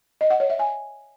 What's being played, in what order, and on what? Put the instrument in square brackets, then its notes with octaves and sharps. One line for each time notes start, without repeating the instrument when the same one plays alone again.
[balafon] D#5
F#5
C#5
E5
G#5